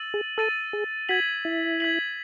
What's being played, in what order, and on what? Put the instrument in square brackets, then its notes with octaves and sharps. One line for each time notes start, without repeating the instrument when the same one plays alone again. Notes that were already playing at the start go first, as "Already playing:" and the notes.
Already playing: [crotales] E6 A6 D#7 F#7
[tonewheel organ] G#4
[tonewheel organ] A4 [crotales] E6 A6 D#7 F#7
[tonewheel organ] G#4
[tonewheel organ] F#4 [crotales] G#6 B6 F#7
[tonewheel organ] E4
[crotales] G#6 B6 F#7